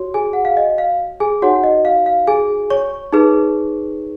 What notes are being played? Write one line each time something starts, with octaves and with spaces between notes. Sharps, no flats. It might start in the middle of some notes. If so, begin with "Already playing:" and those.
Already playing: F#4 C#5
G#4 G#5
F#5
F5
D#5
F5
G#4 G#5
D#4 F#4 C#5 F#5
D#5
F5
F5
G#4 G#5
C#5 C#6
D#4 G#4 B4